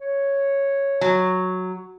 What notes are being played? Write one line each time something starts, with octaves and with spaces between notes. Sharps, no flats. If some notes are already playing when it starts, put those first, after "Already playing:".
C#5
F#3